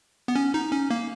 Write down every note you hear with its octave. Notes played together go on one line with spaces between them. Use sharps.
B3
C#4
D#4
C#4
A#3